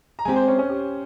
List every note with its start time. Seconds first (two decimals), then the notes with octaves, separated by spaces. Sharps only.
0.19 A#5
0.25 G#3 C4 G4 G#5
0.36 C5
0.48 C#4
0.59 C#4
0.70 G4